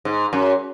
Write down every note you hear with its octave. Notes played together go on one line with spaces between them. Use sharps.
G#2
F#2